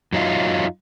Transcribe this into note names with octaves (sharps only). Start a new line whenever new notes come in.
F#2 F#3 D#4 F4